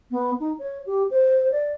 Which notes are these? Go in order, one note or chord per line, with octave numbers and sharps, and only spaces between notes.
B3
D#4
C#5
G4
C5
D5